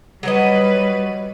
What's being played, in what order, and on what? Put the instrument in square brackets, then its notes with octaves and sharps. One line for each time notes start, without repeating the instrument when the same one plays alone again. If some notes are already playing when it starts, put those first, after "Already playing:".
[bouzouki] F#3 C#5 D#5 [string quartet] G3 B4